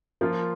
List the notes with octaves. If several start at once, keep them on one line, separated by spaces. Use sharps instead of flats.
F3 A#3 F4